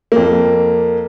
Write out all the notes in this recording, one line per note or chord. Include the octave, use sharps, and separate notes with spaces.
F2 A#3